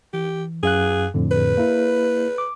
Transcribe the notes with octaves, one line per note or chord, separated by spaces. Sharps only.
E3 G4
F#2 G#4 F5 F#6
F2 A2 D3
B4
A#3 E4
D6